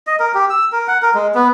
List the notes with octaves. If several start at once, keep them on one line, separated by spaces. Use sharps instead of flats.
D#5
A#4
G4
E6
A#4
F#5
A#4
G#3
B3